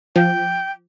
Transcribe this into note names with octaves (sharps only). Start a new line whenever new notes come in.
F3 G5